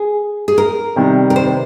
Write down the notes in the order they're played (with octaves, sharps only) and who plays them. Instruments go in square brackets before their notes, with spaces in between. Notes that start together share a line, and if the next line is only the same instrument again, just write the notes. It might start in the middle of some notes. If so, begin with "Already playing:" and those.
Already playing: [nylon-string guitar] G#4
G#4
A#4
[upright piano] C3 D#3 G3
[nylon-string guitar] A#4
C5